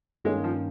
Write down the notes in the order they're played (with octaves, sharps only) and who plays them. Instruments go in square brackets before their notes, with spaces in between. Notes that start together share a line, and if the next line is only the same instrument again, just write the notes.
[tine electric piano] G2 D#3 A#3 C#4 [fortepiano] G#3
[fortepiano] F3